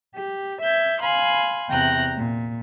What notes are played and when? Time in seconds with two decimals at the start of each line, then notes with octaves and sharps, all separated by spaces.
0.17 G4
0.62 E5 G6 G#6
1.00 F5 G#5 B5 C6
1.69 E2 C3 G5 A#5 F#6 A#6
2.17 A#2